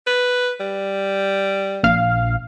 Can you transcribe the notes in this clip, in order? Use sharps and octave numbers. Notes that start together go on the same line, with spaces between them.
B4
G3
A#1 F5